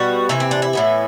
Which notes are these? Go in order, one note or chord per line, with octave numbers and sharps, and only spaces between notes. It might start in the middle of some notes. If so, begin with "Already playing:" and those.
Already playing: B2 G3 B3 F#4
C3 E3 A3 E4
C4
D4
E4
A2 E3 B3